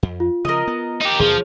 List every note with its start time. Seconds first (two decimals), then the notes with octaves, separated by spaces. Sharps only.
0.03 F2
0.20 F4
0.45 C#3 F3 A#4 D#5
0.67 B3
1.01 D#4 G4
1.20 D#2 B2 F3 F#3 G#4